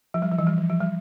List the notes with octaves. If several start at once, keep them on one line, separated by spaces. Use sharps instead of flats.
F3
G3
F3
E3
G3
F3
F3
G3